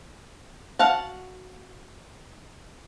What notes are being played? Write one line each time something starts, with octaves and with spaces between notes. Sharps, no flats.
F#4 F5 F#5 A5